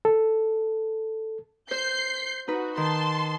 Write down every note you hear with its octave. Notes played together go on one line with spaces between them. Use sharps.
A4
C5 G6 C7
D#4 F#4 B4
D#3 A5 C6